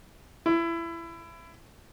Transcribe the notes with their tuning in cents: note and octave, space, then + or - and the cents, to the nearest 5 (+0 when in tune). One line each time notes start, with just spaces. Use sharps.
E4 +25